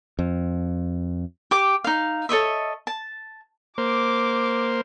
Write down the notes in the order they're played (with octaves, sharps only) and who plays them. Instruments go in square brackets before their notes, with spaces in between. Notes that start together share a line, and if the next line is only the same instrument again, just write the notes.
[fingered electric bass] F2
[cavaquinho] G4 D6
D#4 F5
A4 C#5 D#5 E5
A5
[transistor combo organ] A#3 C5 [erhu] D6